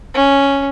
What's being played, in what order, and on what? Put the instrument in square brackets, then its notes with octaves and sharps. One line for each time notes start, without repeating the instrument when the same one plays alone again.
[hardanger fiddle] C#4